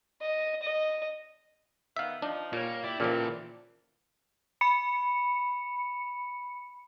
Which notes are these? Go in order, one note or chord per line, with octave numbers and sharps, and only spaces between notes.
D#5
D#5
D#3 B3 E5 F5
F3 D4 D#4
A#2 C#3 G3 A#3 C#5
E4 G4 D5
A#2 C#3 E3 F3 A4
B5 C#7